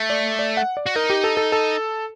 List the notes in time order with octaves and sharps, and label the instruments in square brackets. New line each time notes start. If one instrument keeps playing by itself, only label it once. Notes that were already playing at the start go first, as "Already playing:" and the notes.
Already playing: [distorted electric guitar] A3
[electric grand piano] D5
D5
F#5
D5
[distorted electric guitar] F#4
[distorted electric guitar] D#4 [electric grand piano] A#4
[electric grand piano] G4
A4
A4
A4